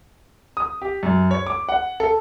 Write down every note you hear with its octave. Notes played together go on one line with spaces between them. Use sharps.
D#6
G4
F#2
C#5
D6
F#5
A4